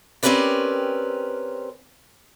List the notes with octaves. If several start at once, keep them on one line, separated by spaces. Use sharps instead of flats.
C4 C#4 G4 A#4 B4 D5